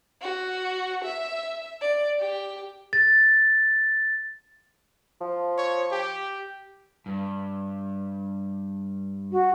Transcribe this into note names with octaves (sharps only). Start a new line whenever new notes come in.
F#4
E5
D5
G4
A6
F3
C#5
G4
G2
F#4